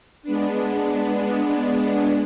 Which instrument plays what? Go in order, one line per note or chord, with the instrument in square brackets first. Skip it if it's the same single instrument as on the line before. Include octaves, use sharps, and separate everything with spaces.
[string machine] G#3 B3 D4